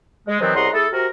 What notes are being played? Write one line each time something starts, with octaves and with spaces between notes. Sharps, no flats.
G#3
C3 D#3 E3 F#3 B3 C4
C2 C#3 D#5 F#5 A#5 C6
A3 E4 G#4 A4
C3 F#4 A#4